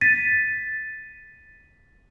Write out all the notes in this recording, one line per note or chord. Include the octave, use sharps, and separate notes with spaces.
A6 B6 D#7